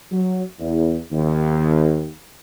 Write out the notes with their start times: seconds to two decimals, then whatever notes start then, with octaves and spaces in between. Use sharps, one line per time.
0.11 F#3
0.59 E2
1.11 D#2